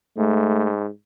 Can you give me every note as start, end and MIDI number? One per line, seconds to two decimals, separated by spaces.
0.18 0.89 44
0.18 0.71 57